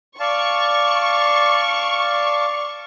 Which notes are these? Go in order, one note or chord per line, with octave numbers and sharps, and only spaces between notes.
D5 F5 A5 C#6